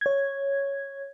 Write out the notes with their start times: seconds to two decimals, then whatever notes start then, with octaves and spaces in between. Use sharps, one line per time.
0.01 C#5 G#6